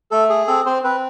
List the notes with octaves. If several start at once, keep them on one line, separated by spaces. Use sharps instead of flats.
A3 A4
G#4
C4 A4
C4 C5
C4 B4